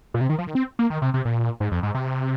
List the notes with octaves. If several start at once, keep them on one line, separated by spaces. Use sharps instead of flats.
A#2
C3
D#3
F3
D#3
C4
A#3
D#3
C3
C3
A#2
G#2
F2
G#2
C3